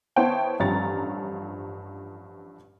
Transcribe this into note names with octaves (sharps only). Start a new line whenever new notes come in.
B3 E4 C5 C#5 G5 A5
A1 G2 F3 C#4 A#5 A6